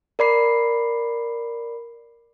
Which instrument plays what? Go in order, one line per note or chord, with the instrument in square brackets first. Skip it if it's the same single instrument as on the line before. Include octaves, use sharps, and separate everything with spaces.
[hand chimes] A#4 D5 B5 C7